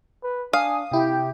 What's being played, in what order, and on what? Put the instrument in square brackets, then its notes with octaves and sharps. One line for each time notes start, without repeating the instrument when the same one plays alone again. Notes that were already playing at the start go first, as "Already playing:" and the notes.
[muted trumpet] B4
[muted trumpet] D4 [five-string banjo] F5 [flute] G#5 [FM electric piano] D#6
[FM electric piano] C3 E4 [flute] G4 [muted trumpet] G5